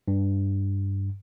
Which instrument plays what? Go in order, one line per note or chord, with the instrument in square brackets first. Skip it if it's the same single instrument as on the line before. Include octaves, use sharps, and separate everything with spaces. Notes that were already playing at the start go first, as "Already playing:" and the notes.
[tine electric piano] G2